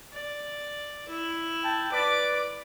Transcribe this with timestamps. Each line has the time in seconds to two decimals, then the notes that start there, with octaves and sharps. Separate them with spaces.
0.12 D5
1.09 E4
1.63 G5 A5
1.92 B4 D5 D6